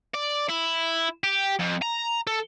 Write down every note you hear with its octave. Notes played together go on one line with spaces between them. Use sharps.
D5
E4
G4
F2
A#5
A4